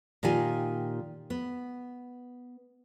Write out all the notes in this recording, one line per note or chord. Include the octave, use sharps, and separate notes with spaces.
A#2 D#3 F4 G4 G#5
B3